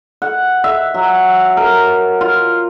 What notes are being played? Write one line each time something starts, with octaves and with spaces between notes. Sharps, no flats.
F#5
E5
F#3
A#4
F4